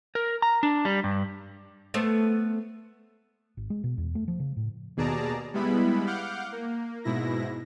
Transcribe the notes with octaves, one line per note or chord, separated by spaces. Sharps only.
A#4
A#5
D4
G3
G2
A3 B3 C5
G#1
G#3
B2
E2
A3
F3
C#3
A2
D#2 B2 G#4 D5 A5 A#5
G3 G#3 B3 E4 B5
F5 F#5 D6 F6 G6
A#3
G#2 B2 E4 A#6